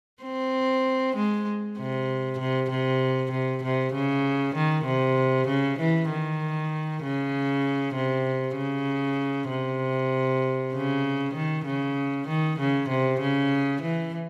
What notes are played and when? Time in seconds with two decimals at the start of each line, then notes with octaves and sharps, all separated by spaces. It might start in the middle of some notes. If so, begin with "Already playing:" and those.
0.23 C4
1.15 G#3
1.78 C3
2.39 C3
2.70 C3
3.31 C3
3.63 C3
3.94 C#3
4.55 D#3
4.85 C3
5.48 C#3
5.79 E3
6.10 D#3
7.02 C#3
7.95 C3
8.56 C#3
9.49 C3
10.73 C#3
11.34 D#3
11.65 C#3
12.27 D#3
12.59 C#3
12.89 C3
13.20 C#3
13.81 E3